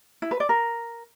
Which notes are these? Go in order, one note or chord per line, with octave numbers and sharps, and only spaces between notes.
E4
B4
D5
A#4